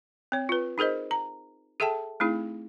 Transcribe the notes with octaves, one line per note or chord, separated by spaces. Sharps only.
C4 C#5
F4 B4
D#4 G#4 A#4 C5 D#5
A#5
G#4 A4 E5 G5 A5
A3 C4 D#4 E4 G#4